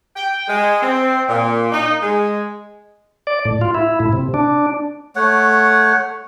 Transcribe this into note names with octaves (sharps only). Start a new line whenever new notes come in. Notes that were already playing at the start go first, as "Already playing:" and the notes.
G5
G#3
C4
A#2
D#4
G#3
D5
A2
F4
E4
A2
C3
D4
A3 C#5 F#5